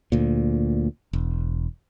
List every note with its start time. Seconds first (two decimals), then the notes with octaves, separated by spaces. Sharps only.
0.12 D2 A#2
1.13 E1